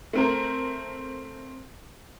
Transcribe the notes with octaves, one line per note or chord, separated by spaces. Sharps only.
A3 C4 A#4